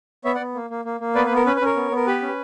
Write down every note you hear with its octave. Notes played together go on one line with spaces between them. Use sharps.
B3 C#5 E5
D5 F#5
B3
A#3
A#3
A#3
A#3
B3 B4 D5
B4
B3 A#4
C#4 B4
B4
C#4 A#4 C#5
B3
B3
A#4
G4 B4
C#4